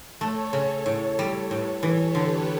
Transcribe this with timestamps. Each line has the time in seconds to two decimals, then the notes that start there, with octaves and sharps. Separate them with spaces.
0.21 A3 A4 C#5
0.53 C#3
0.86 A2
1.19 G3
1.50 A2 G4 B4
1.83 E3 A4 C#5
2.15 D3 G4 B4